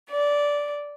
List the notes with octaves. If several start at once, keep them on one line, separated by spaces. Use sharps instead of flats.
D5